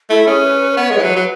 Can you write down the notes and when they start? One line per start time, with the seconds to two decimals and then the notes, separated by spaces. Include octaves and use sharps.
0.10 A3 E4
0.27 C#4 G#4
0.44 B4
0.61 B4
0.72 B4
0.77 B3 C#5
0.91 G#3
0.97 E3
1.03 F#3 B4
1.16 F#3